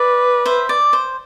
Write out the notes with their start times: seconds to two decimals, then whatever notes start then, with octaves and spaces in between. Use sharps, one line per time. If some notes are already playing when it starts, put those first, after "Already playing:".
Already playing: B4 D5
0.46 C5 E5
0.69 D5
0.93 C5